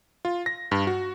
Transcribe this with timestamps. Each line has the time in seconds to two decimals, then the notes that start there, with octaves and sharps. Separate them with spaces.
0.25 F4
0.46 A#6
0.71 G2
0.87 F#4